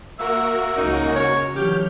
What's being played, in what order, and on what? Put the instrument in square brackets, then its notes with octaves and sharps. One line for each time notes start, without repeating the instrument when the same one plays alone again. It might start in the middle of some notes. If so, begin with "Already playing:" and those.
[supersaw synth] A#3 F#4 A#4 [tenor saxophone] E5
[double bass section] C#2 C#3 C#4 [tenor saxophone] D#4
[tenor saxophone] C#5
[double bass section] D3 E3 F#3 [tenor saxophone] G4 [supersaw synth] F6 G6